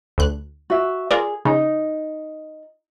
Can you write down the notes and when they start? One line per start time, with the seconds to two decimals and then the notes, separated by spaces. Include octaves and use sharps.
0.18 D2 F#6
0.70 F#4 E5
1.11 F4 G#4 A#4 D5
1.45 C#3 D#4